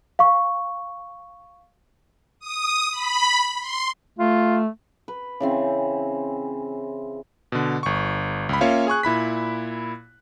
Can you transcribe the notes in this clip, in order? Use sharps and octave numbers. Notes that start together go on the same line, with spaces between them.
F5 C#6
D#6
B5
C6
A3 F4
B4
C#3 E3 C4
B2 D3
G1 C#6
C#2 B5
A#3 C#4 F4 C#5 E5 F5
G#4 G#5 C#6 F#6
A#2 E4 B5 B6